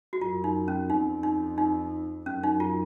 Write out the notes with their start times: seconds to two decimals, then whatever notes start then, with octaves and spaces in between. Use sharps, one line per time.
0.13 F#4
0.21 F#2 F4
0.44 D#4
0.68 C#4
0.90 F2 D#4
1.23 D#4
1.58 D#4
2.26 F#2 C#4
2.43 D#4
2.60 F4